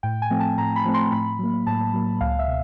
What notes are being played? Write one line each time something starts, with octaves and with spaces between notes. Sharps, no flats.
A2 G5
G#5
F3 A3 C4
A5
A2 A#5
B5
F3 A3 C4
C6
A2 B5
F#3 A#3
A2 A5
F#3 A#3
C#2 F5
E5
B2